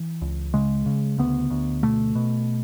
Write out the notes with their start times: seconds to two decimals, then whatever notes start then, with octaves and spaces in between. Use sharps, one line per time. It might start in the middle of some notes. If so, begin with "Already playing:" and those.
Already playing: E3
0.22 C#2
0.54 C#3 G#3
0.86 C#3
1.18 D2 B3
1.50 D2
1.83 B2 A3
2.15 B2